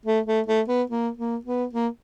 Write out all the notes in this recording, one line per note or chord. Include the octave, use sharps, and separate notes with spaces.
A3
A3
A3
B3
A#3
A#3
B3
A#3